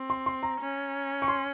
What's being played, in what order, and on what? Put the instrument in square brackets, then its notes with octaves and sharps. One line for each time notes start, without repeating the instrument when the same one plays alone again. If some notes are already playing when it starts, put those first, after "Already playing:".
Already playing: [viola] C4
[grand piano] C6
C6
A#5
[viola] C#4
[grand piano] C#6
C6